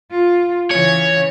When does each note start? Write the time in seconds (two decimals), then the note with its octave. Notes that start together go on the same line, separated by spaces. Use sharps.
0.11 F4
0.71 C#3 E3 C#5